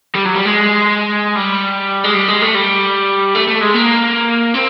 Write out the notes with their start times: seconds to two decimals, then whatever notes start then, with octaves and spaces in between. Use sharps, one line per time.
0.15 G3
0.26 F#3
0.36 G3
0.45 G#3
1.36 G3
2.04 G#3
2.15 G3
2.28 G#3
2.42 A3
2.55 G3
3.35 A3
3.48 A3
3.61 G#3
3.74 A#3
4.54 C4